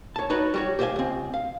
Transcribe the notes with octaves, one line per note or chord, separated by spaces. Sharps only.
C#5 A5
D#4 F#4 B4 C#5 D5
G3 F#4 C#5
G4 C5 D5 E5 F5 G#5
C#2 C4
F5